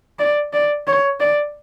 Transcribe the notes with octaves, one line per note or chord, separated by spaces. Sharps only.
D5
D5
C#5
D5